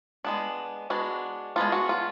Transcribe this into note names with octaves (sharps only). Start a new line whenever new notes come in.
G#3 B3 D4
G#3 B3 D4 F#4
G#3 B3 D4 F4
F#4
F4